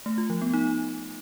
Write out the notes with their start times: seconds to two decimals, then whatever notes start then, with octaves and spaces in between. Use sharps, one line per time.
0.06 A3
0.18 F4
0.30 F3
0.42 B3
0.54 D#4